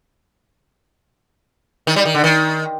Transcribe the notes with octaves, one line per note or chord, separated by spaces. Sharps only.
D#3
G3
D#3
D3
D#3